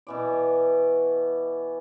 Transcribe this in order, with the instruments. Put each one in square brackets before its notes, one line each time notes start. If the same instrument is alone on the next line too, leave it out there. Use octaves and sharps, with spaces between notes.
[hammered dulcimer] B2 E3 D5